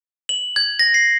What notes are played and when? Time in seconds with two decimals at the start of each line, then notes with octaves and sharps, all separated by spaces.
0.29 F#7
0.56 G#6
0.79 A#6
0.94 C7